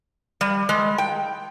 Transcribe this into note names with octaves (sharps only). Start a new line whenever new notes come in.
G3
G#3
G5